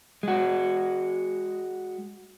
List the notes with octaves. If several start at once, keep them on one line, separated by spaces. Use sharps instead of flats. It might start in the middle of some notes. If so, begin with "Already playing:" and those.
G#3 F#4